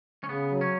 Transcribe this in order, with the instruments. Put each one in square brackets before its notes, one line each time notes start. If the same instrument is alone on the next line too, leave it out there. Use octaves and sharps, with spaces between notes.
[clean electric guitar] C#4
[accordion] C#3 [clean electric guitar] B3
[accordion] F#3
[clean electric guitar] C#4